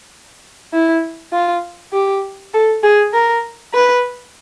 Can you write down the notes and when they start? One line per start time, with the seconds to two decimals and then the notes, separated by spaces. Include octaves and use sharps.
0.73 E4
1.33 F4
1.93 G4
2.54 A4
2.83 G#4
3.14 A#4
3.74 B4